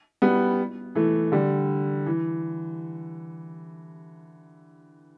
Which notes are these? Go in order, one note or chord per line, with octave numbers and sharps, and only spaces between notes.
G3 B3
E3 A3
D3 G3
E3